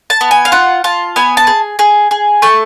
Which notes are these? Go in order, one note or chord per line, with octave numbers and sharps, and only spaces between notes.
A5
B3
G#5
F5
F4 F#5
F4 A5
B3 G#5
A5
G#4
G#4
G#4
A3 A5